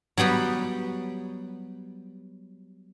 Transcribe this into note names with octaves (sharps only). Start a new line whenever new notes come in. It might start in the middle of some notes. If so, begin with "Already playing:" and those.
F#3 G3 B3 G4